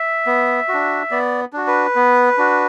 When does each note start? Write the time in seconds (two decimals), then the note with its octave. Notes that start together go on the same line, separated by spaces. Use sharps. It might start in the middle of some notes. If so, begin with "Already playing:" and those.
Already playing: E5
0.26 B3
0.69 D4 F#4
1.11 B3 D5
1.53 D4 F#4
1.67 B4
1.96 B3
2.38 D4 F#4